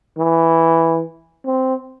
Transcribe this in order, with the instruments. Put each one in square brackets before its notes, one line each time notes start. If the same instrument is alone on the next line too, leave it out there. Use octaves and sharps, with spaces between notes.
[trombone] E3
C4